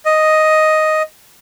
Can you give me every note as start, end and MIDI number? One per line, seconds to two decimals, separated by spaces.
0.06 1.02 75